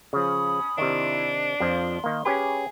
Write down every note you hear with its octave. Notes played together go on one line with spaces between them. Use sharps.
C#3 F3 C#4 B5 D#6
C3 D#3 D4 E4
F2 F3 C6
D#3 A#3
C#4 G4 G#4 B4